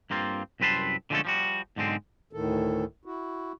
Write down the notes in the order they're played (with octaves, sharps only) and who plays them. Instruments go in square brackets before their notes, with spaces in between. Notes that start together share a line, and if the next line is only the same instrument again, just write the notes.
[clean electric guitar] G2 A#3 C4 F4
C2 F#2 C4 B4 A5 C6
D3 F3 G#3 A3 C#4 A4
F3 G3 F#4
B1 G#2 D3 G#3 C4
[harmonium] D2 A2 D#3 A4
E4 F#4